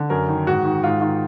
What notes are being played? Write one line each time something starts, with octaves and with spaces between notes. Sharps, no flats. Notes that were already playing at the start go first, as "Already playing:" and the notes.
Already playing: D3
F#2 A#4
D#3
G#2 F#4
D#3
G#2 F4
D#3 F4